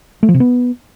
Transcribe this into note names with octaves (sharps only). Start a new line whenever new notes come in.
A3
F3
C3
B3